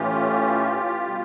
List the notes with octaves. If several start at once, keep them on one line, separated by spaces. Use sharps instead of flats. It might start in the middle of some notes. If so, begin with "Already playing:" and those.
Already playing: A2 E3 A3 C#4 F4 G4
B2 G3